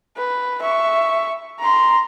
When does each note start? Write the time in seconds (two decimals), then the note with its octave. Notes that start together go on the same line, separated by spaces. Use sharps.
0.17 B4
0.61 E5 C#6
1.60 A#5 C6